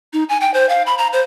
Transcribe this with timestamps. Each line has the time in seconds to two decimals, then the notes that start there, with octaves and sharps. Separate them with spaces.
0.13 D#4
0.29 G#5
0.41 G5
0.54 C5
0.69 F5
0.87 B5
0.98 A#5
1.13 C5